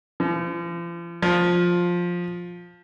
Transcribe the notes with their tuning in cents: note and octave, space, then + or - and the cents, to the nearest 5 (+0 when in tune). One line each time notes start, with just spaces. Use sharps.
F3 -40
F3 +10